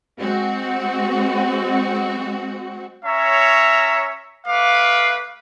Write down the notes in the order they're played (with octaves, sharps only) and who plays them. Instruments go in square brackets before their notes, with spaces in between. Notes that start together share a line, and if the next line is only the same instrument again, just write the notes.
[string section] G#3 C4 F#4
[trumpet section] C#4 C#5 E5 A#5
A3 B4 F5 D6